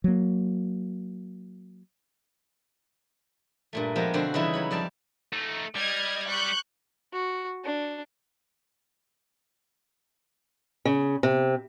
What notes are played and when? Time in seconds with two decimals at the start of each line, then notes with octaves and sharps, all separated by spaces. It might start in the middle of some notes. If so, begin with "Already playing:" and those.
0.04 F#3 A#3
3.73 G2 A#2 A3
3.96 F3 G#3 A#3 B3 F#4 G4
4.13 B2 D3 C4 D4 F#4 C5
4.34 C#3 E3 G3 D#4 E4 E5
4.54 F#3 C#5 B5
4.71 F2 G3 D5 A5
5.33 A3 D#4
5.76 G3 D#5 F6 G#6
6.28 C#6 F#6 G6
7.13 F#4
7.65 D4
10.85 C#3
11.23 C3